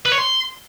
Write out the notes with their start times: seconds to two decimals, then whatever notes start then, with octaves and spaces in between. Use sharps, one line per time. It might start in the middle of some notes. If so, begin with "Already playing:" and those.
0.06 B4
0.12 C#5
0.18 C6